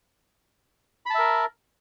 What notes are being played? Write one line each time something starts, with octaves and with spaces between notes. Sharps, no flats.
A#4 E5 A5 B5